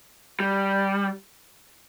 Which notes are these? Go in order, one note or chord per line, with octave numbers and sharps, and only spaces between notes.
G3